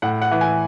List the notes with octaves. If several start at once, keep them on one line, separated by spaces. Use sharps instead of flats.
A2 F#5
F#5
E3
G#5